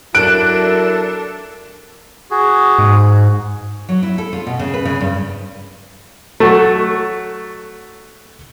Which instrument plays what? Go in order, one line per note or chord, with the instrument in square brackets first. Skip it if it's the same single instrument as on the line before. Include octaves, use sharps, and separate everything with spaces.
[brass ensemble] F#3 E4 A#4 [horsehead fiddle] D4 A4 [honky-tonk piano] F#6 [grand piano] D7
[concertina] F#4 G#4
[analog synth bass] G#2
[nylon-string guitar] F#3
E4
A4
F4
B2
C#3
B4
C#3
G2
[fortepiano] F#3 A3